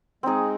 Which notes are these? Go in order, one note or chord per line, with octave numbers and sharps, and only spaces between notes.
G#3 C4 D#4 G#4